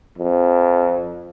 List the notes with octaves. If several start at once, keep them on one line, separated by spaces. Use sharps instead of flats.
F2